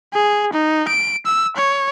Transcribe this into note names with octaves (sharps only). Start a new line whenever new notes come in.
G#4
D#4
D7
E6
C#5